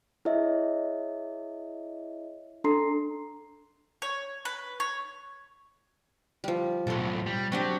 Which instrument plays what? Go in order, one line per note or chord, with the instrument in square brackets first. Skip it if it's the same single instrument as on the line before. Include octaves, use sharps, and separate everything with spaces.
[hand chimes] E4 G#4 C#5 D#5 E5
D4 A4 A#5 C6 C7
[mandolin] C#5
B4
C#5
[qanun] F3 G3
[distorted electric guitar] B1 A2 [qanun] A4 C6
[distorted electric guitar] G3
[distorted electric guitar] F#3 [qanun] C4 D4 G4